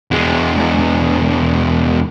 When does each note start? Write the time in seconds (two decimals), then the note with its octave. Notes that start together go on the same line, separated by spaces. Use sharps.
0.11 E2 G#3